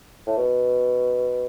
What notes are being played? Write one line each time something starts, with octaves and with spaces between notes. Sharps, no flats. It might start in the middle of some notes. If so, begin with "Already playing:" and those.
A2
B2